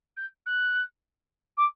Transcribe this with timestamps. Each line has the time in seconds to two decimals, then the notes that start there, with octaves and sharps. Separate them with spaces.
0.17 G6
0.46 F#6
1.57 D6